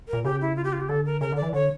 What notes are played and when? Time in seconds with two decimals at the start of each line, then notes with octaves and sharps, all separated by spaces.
0.08 A#4
0.13 A#2
0.24 C#3 G4
0.41 E4
0.56 F4
0.64 G4
0.73 F4
0.81 G4
0.89 D3 A4
1.06 A#4
1.21 C#3 A#4
1.32 D3 D5
1.42 E3
1.53 D3 C#5